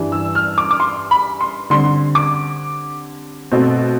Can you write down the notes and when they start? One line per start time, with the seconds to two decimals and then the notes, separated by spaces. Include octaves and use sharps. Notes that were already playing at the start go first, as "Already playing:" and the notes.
Already playing: G2 E3 G3 D4
0.12 E6
0.35 F6
0.58 D6
0.71 D6
0.80 C6
1.11 B5
1.41 C6
1.70 D3 G3 C4 C6
2.15 D6
3.52 B2 A3 C4